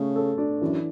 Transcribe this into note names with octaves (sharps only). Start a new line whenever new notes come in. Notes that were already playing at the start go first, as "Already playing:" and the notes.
Already playing: C#3 A3 C#5
A4
D4
F#2 E3